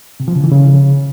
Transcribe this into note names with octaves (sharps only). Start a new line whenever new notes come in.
C3
F3
C#3
E3
C#3